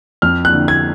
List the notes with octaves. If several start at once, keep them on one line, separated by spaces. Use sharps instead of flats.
F2 F6
F#6
D3
G#6